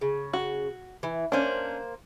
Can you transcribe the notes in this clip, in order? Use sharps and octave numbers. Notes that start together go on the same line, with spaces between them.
C#3
F#4
E3
A#3 C#4 D4 C5